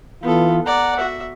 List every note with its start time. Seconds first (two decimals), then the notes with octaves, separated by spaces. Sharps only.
0.23 E3 B3 F4 A4
0.66 D5 F#5 A#5
0.99 F#4 E5